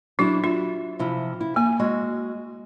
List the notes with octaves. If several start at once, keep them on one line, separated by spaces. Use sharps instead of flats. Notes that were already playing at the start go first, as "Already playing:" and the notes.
F#3 D4 E4 F#4
F4 E5
C3 F3 E4
E4
A#3 G#5
G#3 F#4